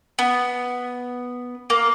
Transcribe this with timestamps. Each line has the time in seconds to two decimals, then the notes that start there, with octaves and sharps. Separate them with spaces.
0.19 B3
1.70 A#3